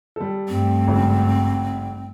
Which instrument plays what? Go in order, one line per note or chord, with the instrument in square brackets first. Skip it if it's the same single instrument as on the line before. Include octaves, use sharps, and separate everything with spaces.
[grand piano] G3 A4
[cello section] G2 A3 [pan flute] C4
[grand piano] G#1 C#3 F#4